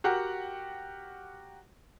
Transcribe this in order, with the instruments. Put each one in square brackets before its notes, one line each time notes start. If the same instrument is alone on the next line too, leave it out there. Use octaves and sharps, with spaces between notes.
[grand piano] F#4 G4 A#4 F#5